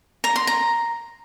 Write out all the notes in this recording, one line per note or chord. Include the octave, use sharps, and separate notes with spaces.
A#5
C6
A#5